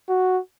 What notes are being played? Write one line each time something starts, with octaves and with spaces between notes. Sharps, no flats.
F#4